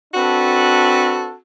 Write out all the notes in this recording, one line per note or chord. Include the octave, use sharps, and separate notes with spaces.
C4 D4 F#4 A4 B4